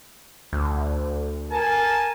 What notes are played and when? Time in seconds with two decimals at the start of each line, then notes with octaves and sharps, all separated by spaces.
0.53 D2
1.51 A#4 G#5 A5